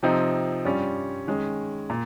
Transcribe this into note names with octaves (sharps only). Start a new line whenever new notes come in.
C3 F3 C4 D#4
G2 G3 C#4 F4
D#3 G#3 C#4 G#4
A#2